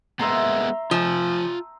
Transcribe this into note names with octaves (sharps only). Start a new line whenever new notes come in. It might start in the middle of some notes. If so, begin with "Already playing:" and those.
G#3 A#3 B3 E5 A#5 C6
F3 F4 G#5